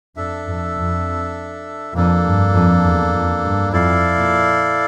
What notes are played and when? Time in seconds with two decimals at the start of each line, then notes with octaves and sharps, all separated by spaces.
0.16 F2 D4 A4 E5
0.46 F2
0.77 F2
1.94 F2 A#3 D4 A4
2.24 G2
2.53 F2
2.83 E2
3.12 F2
3.43 G2
3.72 F2 E4 A4 D5 F5
4.17 A#2